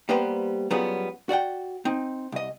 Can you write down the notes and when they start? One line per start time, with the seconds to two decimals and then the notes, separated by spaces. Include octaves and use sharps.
0.09 G3 A#3 B3 G4 B4 C5
0.70 F#3 G3 B3 C#4 F4 G#4
1.29 F#4 D5 F#5 G5
1.85 C4 D#4
2.32 C2 D#5